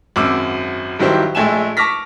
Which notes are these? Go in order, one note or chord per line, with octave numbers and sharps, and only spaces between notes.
G#1 F#2 D6 E6
G2 D#3 F#3 E4 G4 C5
A#1 G#3 A3 G5 G#5 E7
A5 C#6 D6 F6 A#6 B6